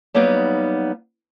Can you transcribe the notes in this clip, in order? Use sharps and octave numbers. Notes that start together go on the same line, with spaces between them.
F#3 G3 A#3 B3 D#4